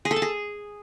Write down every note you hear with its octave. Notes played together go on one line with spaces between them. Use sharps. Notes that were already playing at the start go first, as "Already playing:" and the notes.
G#4
A4
A5
G#4